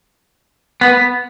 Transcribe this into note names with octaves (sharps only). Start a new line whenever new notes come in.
B3